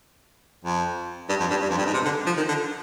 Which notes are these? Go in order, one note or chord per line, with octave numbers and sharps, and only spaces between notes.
F2
G2
F2
G2
G2
F2
G2
G#2
C3
D3
F3
D#3
D3